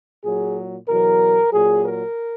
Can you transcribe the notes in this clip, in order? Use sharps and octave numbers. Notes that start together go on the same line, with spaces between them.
A#2 F#3 G#4
E2 B2 F#3 A#4
A#2 F#3 G#4
A#4